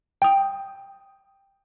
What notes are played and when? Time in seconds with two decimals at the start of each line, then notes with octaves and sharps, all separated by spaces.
0.22 G5 D#6